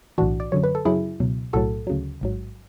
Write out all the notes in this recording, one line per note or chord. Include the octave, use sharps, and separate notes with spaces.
B1 A2 E3 D4 F#4
D5
F#2 D3 F#3 C#5
B4
A4
F#2 C#3 F#3 E4 G#4
C#2 B2 F#3
B1 A2 F#3 F#4 A4
D2 C#3 F#3
A1 G#2 F#3